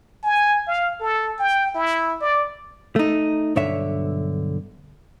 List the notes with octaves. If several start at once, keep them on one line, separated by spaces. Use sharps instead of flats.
G#5
F5
A4
G5
E4
D5
A3 D#4
B1 G2 D3 C#5 E5